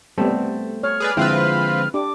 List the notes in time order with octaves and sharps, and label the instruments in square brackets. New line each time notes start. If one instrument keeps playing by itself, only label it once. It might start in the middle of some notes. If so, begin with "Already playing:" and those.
[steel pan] G3 B3 [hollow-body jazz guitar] A3 C4 A4
[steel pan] C#5 [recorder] F6
[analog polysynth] G#4 B4 D5
[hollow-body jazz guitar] D3 F3 G#3 [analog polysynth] C4 F4 B4 [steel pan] E4
[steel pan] D4 G4 [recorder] D6